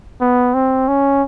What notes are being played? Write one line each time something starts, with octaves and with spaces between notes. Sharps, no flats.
B3
C4
C#4